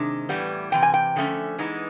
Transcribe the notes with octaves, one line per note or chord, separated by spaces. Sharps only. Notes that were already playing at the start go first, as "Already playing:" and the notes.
Already playing: C3 D#3 G#3 D4
A2 E3 G3 B3
C3 E3 G5
G#5
G5
D3 F3 A3 C#4
E3 G#3 B3 D#4